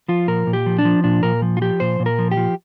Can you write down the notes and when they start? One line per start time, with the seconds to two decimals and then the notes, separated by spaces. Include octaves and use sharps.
0.08 F3 F4
0.28 A#2 A#4
0.47 A#2
0.53 G4
0.66 F3
0.79 D4
0.85 F3
1.04 A#2 D4
1.23 A#2 A#4
1.42 F3
1.57 F4
1.61 F3 G4
1.80 A#2 C5
2.00 A#2
2.06 A#4
2.19 F3
2.31 G4
2.37 F3